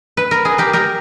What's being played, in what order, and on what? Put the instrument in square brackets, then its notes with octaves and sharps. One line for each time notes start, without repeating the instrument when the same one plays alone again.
[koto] B4
A#4
G#4
G4 A#4
G4 A#4